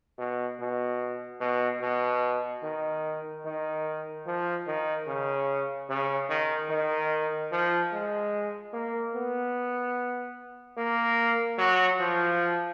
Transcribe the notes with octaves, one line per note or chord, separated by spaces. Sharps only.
B2
B2
B2
B2
D#3
D#3
F3
D#3
C#3
C#3
D#3
D#3
F3
G#3
A#3
B3
A#3
F#3
F3